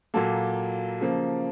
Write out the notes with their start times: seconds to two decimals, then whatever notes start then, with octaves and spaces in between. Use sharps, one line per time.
0.14 A#2 F#3 A#3 A4
1.01 C#3 F3 A#3